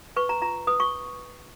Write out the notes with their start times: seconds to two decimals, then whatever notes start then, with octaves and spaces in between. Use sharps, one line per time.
0.16 B4 C#6
0.29 A#5
0.42 F4 A#5
0.67 B4 D#6
0.80 C#6